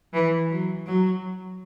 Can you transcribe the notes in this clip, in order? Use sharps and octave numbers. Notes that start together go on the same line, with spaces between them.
E3
F#3
F#3